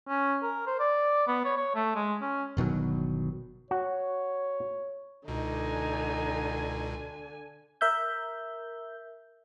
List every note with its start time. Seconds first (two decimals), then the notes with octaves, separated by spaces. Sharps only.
0.08 C#4
0.43 A#4
0.67 C5
0.80 D5
1.27 B3
1.45 C#5
1.57 C#5
1.75 A3
1.96 G#3
2.21 C#4
2.57 G1 B2 D#3 F#3
3.71 F#4 C#5
5.28 C#2 B2 D3 D#4 G#5
7.81 A#4 E5 G6